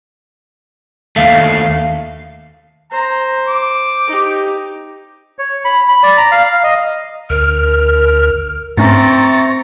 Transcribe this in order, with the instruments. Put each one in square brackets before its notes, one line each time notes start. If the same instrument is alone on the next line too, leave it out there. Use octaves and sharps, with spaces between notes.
[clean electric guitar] D#2 A3 [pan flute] F5
[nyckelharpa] C5 [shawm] A#5
[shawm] D6
[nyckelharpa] D#4 G4
[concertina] C#5
B5
B5
D5
A#5
F5
F5
D#5
[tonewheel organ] D2 F6 [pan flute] A#4
[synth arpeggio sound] G#2 A3 C#4 [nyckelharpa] C4 A#5 [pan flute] E5 [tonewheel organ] C#6 A6